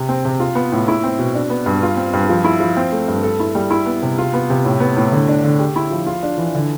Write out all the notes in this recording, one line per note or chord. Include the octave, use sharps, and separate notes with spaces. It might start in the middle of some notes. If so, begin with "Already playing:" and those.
Already playing: C3
C4
C3
F4
B3
A2
E4
C4
B2
D4
B3
G2
F4
C4
G2
F3
E4
F3
C4
A3
G2
A4
E4
G3
E4
B3
C3
F4
B3
C3
A2
B3
A2
D3
D4
D3
G4
E4
F3
F4
D4
E3
D3